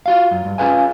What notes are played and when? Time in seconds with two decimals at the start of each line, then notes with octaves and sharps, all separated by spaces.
0.06 F4 F#4 F5
0.31 F#2
0.45 G2
0.58 C#4 F4 G#4 B4 F5 G#5